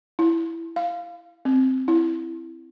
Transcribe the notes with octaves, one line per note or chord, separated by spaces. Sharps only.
E4
F5
C4
E4